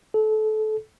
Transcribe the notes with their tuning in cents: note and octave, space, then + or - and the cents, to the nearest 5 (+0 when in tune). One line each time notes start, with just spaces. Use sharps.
A4 -25